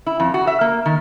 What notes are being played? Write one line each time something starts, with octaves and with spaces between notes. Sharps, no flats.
E4
F2
F#4
E5
A#3
D#3